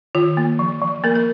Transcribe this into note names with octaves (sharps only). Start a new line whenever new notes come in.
D#3 F4
A#3
F3
F3
A#3 A#4
A#4